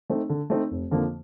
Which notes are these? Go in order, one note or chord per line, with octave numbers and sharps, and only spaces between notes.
A3 C4 D#4
D3
A3 C4 D#4
F1
F2 D3 F3 A#3